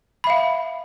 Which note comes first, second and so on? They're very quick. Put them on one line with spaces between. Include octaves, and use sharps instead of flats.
B5 E5 F5